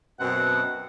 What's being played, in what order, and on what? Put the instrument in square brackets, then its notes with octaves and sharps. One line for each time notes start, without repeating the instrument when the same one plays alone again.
[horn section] F#2 B2 C4 [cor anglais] F#5